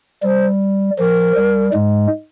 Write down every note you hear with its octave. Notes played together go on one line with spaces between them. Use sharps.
G3 C5
F3 A#4
G3
G#2 G#3